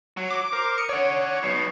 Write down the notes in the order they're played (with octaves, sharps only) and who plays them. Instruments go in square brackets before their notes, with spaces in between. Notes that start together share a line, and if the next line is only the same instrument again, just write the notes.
[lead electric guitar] F#3
[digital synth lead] D6
[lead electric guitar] A#4 [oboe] C5
[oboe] D#6 [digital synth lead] C#7
[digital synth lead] C#5 [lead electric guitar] D5 F#5
[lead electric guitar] B1 B2 [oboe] C#6